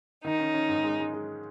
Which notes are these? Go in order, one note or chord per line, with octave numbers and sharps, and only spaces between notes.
D#3 D#4
C#4
C#4
G#2
G#3
G#3
G#3